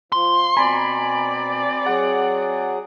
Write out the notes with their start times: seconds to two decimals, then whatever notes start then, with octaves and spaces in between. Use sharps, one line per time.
0.12 F3 C6
0.57 B2 C4 D5 G#5 A#5 B5
1.86 F#3 G#4 F#5